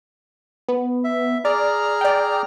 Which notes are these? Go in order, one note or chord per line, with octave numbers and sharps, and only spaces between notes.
B3
E5
G#4 D5 A#5 F6
D5 G5